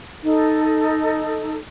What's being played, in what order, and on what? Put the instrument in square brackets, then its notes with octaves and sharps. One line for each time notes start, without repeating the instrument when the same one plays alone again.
[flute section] D#4 A4